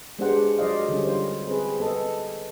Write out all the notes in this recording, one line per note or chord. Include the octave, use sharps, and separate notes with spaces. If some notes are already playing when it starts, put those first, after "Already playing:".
G#3 B3 D4 G4 C5 F#5
F#3 F4 C5 D5 D#5 F5
D3 E3 G3 C#4
F4 C5
C4 G#4 B4
B3 A4 D#5